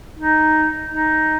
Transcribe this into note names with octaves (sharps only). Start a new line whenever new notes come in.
D#4
D#4